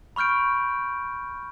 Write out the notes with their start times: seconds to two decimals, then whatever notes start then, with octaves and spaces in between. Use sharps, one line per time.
0.16 B5 C#6 F6 G6 D7